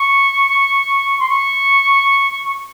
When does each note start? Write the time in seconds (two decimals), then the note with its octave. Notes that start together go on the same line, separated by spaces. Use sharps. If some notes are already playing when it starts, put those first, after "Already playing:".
Already playing: C#6
1.19 C6
1.29 C#6